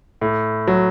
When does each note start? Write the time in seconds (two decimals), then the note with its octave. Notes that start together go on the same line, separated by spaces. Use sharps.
0.21 A2
0.67 F#3